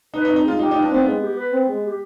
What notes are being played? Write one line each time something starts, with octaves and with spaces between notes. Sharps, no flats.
D#4 B4
D#4
C4
D#4
G#3 F4
D#4 G4
D#4 B4
D4
B3 C4
G#3
G4
B4
C4
G#3
G4